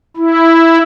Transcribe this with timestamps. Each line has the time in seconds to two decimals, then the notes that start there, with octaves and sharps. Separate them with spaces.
0.17 E4